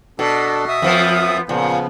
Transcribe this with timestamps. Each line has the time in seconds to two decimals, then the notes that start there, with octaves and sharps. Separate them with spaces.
0.19 B2 D4 A4
0.68 E5 D#6
0.82 F2 F3 B3
1.49 A#2 C#3 F3 B3